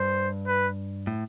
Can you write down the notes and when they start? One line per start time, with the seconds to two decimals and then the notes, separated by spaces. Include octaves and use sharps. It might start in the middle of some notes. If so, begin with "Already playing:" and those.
Already playing: G2 C5
0.47 B4
1.07 A2